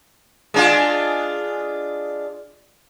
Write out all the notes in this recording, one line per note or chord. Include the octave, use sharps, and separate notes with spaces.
G#3 D4 F4